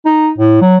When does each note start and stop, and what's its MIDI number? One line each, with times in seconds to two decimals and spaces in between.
0.06 0.30 63
0.38 0.57 45
0.61 0.77 54